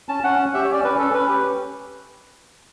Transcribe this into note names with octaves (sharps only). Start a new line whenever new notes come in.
C#4 A5
C#4 F#5
C#4
G4 E5
C#5
C#4 D5
C#4 B4
C#4 A4
C#4 B4
G4